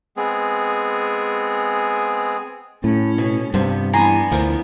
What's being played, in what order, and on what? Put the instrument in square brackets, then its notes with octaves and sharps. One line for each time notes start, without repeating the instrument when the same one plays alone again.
[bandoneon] G#3 B3 C4 G#4
[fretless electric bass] A2 [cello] C#4
[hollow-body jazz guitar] B2
[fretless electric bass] G2 [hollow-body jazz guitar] C3 F3 [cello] B3
[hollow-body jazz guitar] E3 [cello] B3 D4 [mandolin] G#5 A#5 C6
[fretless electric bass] D2 [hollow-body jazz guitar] F3 E4 A#4